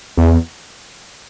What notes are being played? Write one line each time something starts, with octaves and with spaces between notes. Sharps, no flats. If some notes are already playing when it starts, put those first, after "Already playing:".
E2